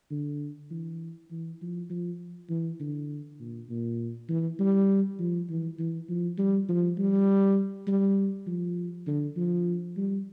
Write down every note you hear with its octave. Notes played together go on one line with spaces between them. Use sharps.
D3
E3
E3
F3
F3
E3
D3
A#2
A#2
E3
G3
F3
E3
E3
F3
G3
F3
G3
G3
F3
D3
F3
G3